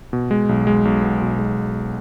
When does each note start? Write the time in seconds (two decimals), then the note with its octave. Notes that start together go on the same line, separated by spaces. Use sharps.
0.13 B2
0.31 G#3
0.49 B1
0.67 G#3
0.85 B1
1.03 B3
1.22 B2
1.39 G#3